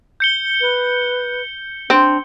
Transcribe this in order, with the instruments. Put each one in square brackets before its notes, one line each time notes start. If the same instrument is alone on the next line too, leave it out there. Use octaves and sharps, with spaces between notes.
[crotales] G6 C#7 G7
[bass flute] B4
[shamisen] C4 [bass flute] D4